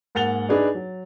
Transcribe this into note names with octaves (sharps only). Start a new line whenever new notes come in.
G#2 A#3 F#5 A6 F7 G7
D4 D#4 G#4 B4 D5
F#3